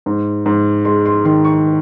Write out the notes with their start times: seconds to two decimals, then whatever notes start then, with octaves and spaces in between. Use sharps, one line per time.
0.06 G#2
0.46 G#2
0.85 G#3 C6
1.06 C6
1.25 D#3 C6
1.45 C#6